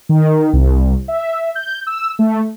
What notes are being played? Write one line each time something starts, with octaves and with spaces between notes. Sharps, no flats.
D#3
C2
E5
G6
E6
A3